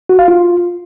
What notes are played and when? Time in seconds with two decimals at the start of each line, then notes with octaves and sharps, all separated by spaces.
0.09 F#4
0.19 F5
0.28 F4